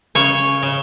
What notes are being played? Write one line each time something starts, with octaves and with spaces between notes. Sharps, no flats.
C#3 C#5
C#3